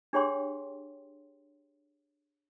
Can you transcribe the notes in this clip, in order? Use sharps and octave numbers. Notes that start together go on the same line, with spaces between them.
D4 G4 G#4 C#5 G5 C6